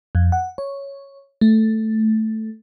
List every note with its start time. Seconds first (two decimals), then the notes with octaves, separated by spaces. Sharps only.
0.15 F2
0.32 F#5
0.58 C#5
1.41 A3